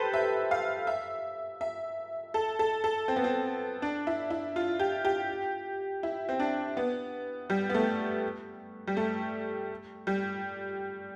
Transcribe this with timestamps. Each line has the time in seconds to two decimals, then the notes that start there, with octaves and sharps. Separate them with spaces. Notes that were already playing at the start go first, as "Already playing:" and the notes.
Already playing: G4 A4 B4 C5
0.14 E5
0.51 F5
0.87 E5
1.61 E5
2.34 A4
2.59 A4
2.84 A4
3.08 C4
3.16 B3
3.24 C4
3.82 D4
4.07 E4
4.30 E4
4.56 F4
4.79 G4
5.05 G4
6.03 E4
6.29 C4
6.39 D4
6.77 B3
7.50 G3
7.70 B3
7.74 A3
8.87 G3
8.97 A3
10.07 G3